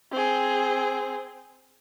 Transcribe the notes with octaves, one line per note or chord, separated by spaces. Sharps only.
C4 G#4